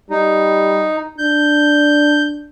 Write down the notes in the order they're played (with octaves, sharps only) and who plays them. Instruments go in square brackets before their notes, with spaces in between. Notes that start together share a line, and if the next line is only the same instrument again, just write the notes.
[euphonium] G3 [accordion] D#4
[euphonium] D4 [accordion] G6